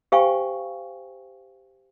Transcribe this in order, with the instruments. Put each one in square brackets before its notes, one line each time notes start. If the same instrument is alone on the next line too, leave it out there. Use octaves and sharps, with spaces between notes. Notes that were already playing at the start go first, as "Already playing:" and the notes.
[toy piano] G4 C5 F5 G5 G#5 C#6